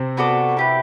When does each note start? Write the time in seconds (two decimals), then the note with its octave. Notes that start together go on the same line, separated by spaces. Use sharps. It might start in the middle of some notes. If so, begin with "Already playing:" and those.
Already playing: C3 C4
0.17 B3 F#4 A4 D5
0.57 E4 G4 B4